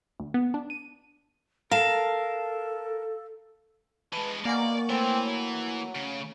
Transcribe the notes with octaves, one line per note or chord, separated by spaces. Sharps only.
D2
B3
D4
D#7
A4 A#4 F5 A5
E3 G#3 B4 A5
B2 A#3 D5 F#5 G#5 C#6
E3 A3 C4 C#5 G#5
F#3
C#3